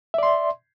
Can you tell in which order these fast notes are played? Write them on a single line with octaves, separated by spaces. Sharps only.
E5 D5 C6